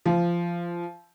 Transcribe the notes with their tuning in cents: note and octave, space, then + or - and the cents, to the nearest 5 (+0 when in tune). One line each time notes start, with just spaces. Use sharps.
F3 -20